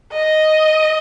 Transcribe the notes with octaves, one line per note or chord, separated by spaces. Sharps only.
D#5